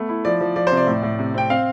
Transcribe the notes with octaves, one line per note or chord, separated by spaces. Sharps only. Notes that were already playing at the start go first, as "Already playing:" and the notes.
Already playing: A3 B3
E4
F3 D5
F3
F3 D5
C3 C5
D5
A2
A2
C3
C4 G5
C4 F5